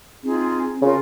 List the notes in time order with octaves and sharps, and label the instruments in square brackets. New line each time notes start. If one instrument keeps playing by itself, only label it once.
[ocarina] C4 [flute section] D#4 F4 G#4
[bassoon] C#3 [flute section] F4 A#4